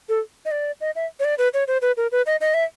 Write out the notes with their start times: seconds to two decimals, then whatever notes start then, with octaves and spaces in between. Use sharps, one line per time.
0.09 A4
0.45 D#5
0.51 D5
0.81 D#5
0.96 E5
1.20 C#5
1.24 D5
1.38 B4
1.54 C#5
1.67 C5
1.82 B4
1.97 A#4
2.12 B4
2.26 D#5
2.41 D#5
2.54 E5